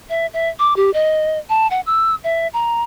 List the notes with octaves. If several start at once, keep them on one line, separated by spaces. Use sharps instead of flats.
E5
E5
D6
G4
D#5
A5
F#5
E6
E5
A#5